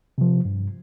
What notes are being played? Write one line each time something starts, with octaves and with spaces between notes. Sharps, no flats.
C3 F3
G2